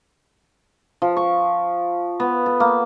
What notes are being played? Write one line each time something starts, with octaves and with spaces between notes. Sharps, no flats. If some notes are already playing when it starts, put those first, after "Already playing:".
F3
C#6
B3
A4
A#3